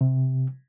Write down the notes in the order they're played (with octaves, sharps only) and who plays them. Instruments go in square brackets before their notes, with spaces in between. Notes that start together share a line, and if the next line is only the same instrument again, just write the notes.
[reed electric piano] C3